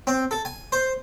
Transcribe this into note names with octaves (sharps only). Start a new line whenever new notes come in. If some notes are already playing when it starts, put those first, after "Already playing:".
C4
A4
G#5
C5